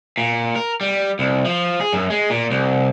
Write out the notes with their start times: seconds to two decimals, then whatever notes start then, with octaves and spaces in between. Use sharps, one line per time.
0.18 A#2
0.56 A#4
0.81 G3
1.19 C2
1.45 F3
1.81 G#4
1.92 F#2
2.10 G#3
2.30 A#2
2.51 C2